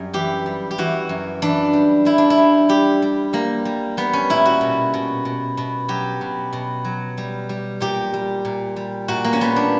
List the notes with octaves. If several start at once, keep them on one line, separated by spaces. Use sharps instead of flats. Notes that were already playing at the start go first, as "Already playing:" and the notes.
Already playing: F#2 G3
E3 G4
G3
G4
E3 F#4
F#2
E3 D4
G3
G3 E4
D4
E4
G3
G3 G4
G3
G3 A#3
G3
G3 B3
C#4
A#2 E4
F#4
B2
B2
B2
B2
F#3 G4
B2
B2
F#3
G3
G3
A#2 G4
G3
A#2
G3
A#2 F#4
A#3
C#4
G3 B3
D4